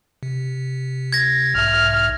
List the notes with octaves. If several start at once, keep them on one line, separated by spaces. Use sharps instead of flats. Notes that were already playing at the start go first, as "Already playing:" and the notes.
C3
G#6 A#6
B1 G#2 E5 F6